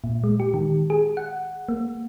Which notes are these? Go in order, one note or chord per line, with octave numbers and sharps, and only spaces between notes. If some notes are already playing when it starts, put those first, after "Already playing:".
A#2
G#3
G4
D#3
G#4
F#5
A#3